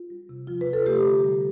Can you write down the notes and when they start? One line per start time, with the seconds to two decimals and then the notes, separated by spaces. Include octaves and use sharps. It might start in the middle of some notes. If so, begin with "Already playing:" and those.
Already playing: F4
0.10 G3
0.29 C3
0.47 F3 F4
0.61 B4
0.68 C3
0.73 A4
0.86 A3 G4
1.06 D3
1.24 G3